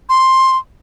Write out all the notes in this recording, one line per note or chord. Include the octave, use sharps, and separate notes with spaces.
C6